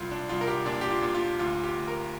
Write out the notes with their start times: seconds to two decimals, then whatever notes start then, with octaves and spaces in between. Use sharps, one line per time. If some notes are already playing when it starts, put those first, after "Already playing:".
Already playing: C2 F4
0.11 D4
0.29 C2 F4
0.41 A#4
0.47 G4
0.66 A#2 D4
0.81 G4
0.90 F4
1.02 A#2
1.14 F4
1.39 D2 F4
1.64 G4
1.75 D2
1.88 A#4